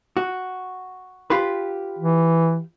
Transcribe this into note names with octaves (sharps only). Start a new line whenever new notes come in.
F#4
F4 G4 B4
E3